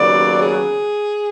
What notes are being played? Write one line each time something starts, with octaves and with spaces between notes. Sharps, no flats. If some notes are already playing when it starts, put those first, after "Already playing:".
Already playing: D#2 C#3 F#3 B3 D5
G#4